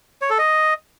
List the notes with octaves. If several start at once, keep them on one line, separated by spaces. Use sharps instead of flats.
C#5
A4
D#5